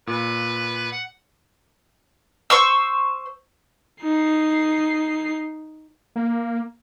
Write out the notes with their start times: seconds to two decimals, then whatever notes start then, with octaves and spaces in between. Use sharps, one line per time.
0.07 A#2 B4
0.91 F#5
2.50 C5 C#6 E6
4.03 D#4 C7
6.16 A#3